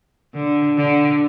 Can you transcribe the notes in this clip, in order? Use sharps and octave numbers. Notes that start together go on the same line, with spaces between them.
D3
D3